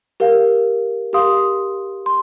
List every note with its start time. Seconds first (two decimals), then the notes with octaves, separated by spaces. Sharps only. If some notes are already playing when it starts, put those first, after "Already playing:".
0.20 G4 A#4 F5
1.13 G4 A#4 F5 C6 D#6
2.06 C6